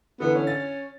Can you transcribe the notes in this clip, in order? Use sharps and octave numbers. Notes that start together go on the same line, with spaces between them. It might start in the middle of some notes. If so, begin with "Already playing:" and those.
D3 E3 B3
C#4
A6